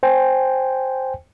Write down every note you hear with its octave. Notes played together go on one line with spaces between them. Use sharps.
C5 G5 G#5